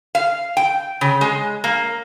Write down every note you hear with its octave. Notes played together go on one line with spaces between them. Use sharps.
F5
G5
C#3
G#3
A#3